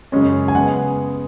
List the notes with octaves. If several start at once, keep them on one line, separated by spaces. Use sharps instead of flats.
F#2 C#3 G#3 C#4
G#5
C#3 G#3 B3 F#5